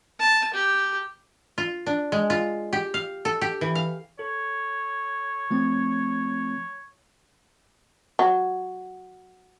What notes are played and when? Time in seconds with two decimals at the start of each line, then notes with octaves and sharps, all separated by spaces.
0.19 A5
0.54 G4
1.58 F4
1.86 D4
2.12 G#3
2.30 F4
2.73 G4
2.94 F5
3.25 A4
3.41 G4
3.61 E3
3.75 F5
4.19 A4 C#5
5.51 F3 A3 C4
8.19 F#3